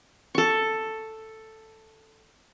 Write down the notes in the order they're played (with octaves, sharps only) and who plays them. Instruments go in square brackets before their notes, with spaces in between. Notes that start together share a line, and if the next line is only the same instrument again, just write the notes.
[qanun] A4 C#6